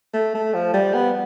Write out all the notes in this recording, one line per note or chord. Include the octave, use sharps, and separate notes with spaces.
A3
A3
F3
G3
B3